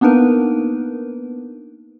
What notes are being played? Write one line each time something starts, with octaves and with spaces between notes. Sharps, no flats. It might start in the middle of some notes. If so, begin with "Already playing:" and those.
A#3 B3 D4 D#4 A#4 B4